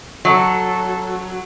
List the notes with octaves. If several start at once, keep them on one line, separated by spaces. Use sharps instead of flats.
F#3 A4